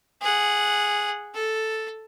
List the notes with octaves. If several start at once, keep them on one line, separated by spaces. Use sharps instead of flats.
G#4 F#5
A4